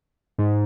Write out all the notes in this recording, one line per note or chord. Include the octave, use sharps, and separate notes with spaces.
G#2